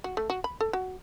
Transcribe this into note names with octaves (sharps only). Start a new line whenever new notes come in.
F#4
A3
F#4
B5
A4
F#4